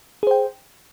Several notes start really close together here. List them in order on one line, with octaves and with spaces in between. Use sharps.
G#4 C5 G5